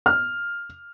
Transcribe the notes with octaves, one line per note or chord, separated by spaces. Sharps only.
F6